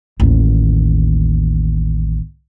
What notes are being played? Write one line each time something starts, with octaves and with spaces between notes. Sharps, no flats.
A1 D#2